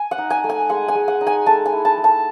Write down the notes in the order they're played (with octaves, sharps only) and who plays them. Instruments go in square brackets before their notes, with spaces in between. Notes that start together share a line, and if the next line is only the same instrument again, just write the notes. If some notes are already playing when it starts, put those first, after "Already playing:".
Already playing: [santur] G#5
F#5
D#4
G#5
A3
G#5
G#3 F#5
G#5
G#3
F#5
D#4
G#5
A3 A5
G#5
E4
A5
A3
A5